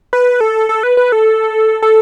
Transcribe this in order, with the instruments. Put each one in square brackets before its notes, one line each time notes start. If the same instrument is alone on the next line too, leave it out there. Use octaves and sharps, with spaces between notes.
[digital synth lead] B4
A4
A4
B4
B4
A4
A4